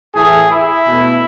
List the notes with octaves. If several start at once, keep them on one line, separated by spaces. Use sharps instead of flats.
A2 E3 A3 G#4
E4
B2 A3